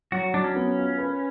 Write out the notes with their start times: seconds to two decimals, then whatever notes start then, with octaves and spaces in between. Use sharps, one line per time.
0.12 F#3 F#4
0.34 F#3 D4
0.44 C#4
0.56 B3
0.78 F4
0.98 B4